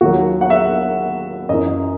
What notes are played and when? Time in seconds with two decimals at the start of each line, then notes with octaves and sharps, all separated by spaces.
0.01 D#2 D#3 F#3 F#4
0.41 F#5
0.50 E5
1.49 F#2 E3 D#5